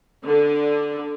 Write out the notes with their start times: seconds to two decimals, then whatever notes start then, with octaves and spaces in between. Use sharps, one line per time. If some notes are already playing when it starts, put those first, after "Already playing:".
0.25 D3